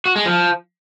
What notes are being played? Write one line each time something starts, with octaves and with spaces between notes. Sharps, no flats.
F#4
G#3
F3